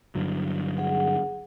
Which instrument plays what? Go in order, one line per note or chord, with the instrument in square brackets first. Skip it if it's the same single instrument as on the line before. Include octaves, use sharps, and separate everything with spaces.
[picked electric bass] G2 D3 F#3
[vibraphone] G#4 F#5